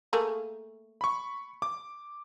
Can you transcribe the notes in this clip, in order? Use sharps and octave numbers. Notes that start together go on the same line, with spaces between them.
A3 A#3 G#4
B5 C#6
D6